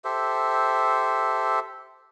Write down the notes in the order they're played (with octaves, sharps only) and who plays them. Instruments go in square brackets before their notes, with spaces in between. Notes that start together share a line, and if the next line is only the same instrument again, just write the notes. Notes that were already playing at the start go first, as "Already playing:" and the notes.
[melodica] G4 A4 C5 E5